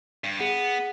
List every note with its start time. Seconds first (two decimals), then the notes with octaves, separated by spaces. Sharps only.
0.24 G2
0.40 B3 G#4 F#5